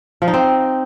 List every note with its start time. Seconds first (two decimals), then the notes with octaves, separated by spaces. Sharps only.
0.22 F3
0.28 D#4
0.34 C4